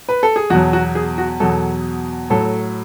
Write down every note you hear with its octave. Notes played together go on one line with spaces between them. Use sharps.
B4
A4
G#4
E2 B2 F#3 F#4
F#4
G#4
F#4
E2 B2 F#3 A4
A2 F#3 A4